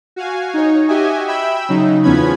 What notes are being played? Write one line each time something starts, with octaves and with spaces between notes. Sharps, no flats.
F#4 F5 G#5
D#4 C#5
F#4 G4 D#5 E5 G#5
E5 G5 B5 E6
C#3 F#3 D#4
E2 F3 B3 C#4 B5 G#6